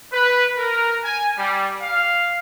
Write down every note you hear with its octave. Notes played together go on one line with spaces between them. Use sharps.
B4
A#4
G#5
G3
F5